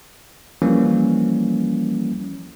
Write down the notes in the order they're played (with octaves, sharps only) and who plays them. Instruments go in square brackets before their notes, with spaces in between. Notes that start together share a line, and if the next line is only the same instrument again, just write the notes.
[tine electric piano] E3 F3 G3 A#3 C#4